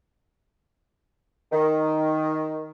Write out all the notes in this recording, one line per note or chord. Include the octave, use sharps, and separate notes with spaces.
D#3